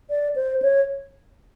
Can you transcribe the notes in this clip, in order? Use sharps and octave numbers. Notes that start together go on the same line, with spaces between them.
D5
C5
C#5